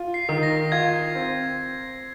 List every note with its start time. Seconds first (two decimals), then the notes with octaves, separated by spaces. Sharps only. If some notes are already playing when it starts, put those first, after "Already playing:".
Already playing: F4
0.14 C7
0.29 D#3
0.43 A#6
0.72 F4 G#6
1.15 C4